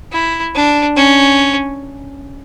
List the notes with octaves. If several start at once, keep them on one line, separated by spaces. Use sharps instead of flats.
E4
D4
C#4